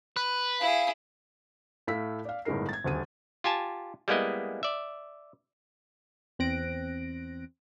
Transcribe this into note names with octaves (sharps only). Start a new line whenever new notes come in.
B4
E4 G#4 F5
A2 A3 F5 E6 B6
D5 F5
G1 A2 G#3 D#4 A#4 C7
G#6 A6
D#1 D2 D#7
F4 G4 G#5 A5
G3 G#3 A#3 B3 E4 D#5
D5 E5
E2 C4 F#6 A#6 D7